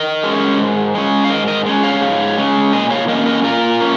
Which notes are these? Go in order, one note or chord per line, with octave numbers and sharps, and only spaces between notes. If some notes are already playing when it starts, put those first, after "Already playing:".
Already playing: A#4 D#5
G#3 C#4
G#2
G#3 C#4
F5
G#2 A#4 D#5
A#4 D#5
G#3 C#4
C#5 F5
G#2
G#3 C#4
A#2 D#5 G#5
C#5 F5
A#3 C#4 A#4 D#5
A#4 D#5
A#2 F4 A#4
A#3 C#4